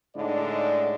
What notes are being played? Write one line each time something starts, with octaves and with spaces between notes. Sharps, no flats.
A2 D3 G#3 D4 D#4 D5